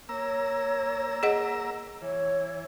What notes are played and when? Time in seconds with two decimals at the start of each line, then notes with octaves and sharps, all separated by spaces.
0.09 A#3 C#5 A#5 E6
1.23 G#4 D#5 F#5
2.02 E3 C#5